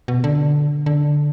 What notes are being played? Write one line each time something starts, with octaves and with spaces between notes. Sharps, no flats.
B2
D3
D3